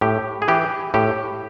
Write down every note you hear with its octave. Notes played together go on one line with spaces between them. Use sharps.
A2 G4
G#4
E3 G4
A2 G4